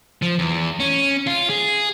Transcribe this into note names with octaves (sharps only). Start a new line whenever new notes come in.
F3
E2
C#4
F4
G#4